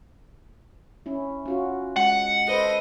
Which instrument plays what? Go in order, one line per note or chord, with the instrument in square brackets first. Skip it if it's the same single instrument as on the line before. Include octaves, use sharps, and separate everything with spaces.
[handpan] C#4 E4
C#4 F4 F#4
[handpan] G#3 [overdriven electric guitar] F#5
[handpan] A4 B4 C5 [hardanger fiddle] D#5